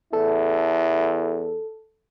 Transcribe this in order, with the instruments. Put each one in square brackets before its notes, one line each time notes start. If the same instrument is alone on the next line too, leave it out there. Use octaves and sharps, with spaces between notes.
[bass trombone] E2 [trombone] E4 [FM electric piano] A4